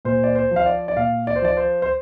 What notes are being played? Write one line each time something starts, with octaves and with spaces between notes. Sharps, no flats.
A#2 C5
D5
C5
F3
F5
D5
D5
A#2 F5
D5
C5
F3 D5
C5
C5